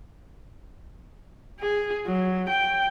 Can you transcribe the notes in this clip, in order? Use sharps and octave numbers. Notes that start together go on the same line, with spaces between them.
G#4
F#3
G5